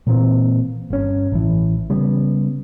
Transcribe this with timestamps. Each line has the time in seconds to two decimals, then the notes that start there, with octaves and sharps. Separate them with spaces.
0.07 A#2 E3 A#3 C4
0.90 G1 C#4
1.32 A1 E3
1.90 C#3 G3 B3